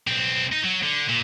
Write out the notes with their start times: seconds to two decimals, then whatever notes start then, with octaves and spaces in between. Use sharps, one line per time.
0.07 B1 C4
0.53 D#4
0.65 F#3
0.83 D3
1.09 A#2